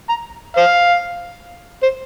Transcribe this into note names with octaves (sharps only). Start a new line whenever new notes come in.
A#5
C5 F5
C5